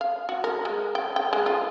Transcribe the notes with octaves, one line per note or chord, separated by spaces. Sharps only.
F5
F#4
A#4
G#3
G5
G5
G#3
F4